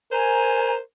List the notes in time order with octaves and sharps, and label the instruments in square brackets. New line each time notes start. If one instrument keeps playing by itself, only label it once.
[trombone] A#4 [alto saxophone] C5 [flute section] G#5 [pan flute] A#5